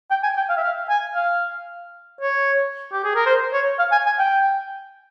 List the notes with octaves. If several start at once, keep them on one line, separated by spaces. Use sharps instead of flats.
G5
G#5
G5
F5
E5
F5
G#5
F5
C#5
G4
G#4
A#4
C5
C#5
F5
G#5
G#5
G5